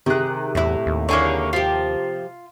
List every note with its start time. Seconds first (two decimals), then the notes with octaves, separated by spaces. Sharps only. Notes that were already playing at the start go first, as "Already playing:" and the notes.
0.06 C3 D#3 G#4 F#6
0.55 E2 A2 E4
0.86 D#2
1.09 D3 A#3 E4 G#4 C#5
1.53 F3 F4 G4